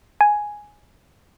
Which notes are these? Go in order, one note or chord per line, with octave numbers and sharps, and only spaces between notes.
G#5